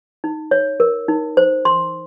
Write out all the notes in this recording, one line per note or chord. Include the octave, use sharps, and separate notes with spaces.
D#4
C#5
A#4
D#4
C5
C6